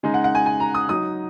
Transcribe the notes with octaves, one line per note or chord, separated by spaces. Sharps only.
C#3 G#3 D#4
F#5
F#5
G#5
G#5
A#5
D#6
F#3 D#4 D#6